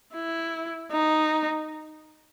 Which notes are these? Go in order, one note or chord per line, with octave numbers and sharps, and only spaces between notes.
E4
D#4